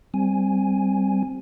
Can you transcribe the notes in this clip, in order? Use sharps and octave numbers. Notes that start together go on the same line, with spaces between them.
G3 C4 G#5